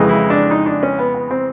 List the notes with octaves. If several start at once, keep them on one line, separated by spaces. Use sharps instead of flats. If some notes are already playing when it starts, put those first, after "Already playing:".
Already playing: F2 C#3 E3 G#3
E4
D4
D#4
D4
C#4
B3
B3
C4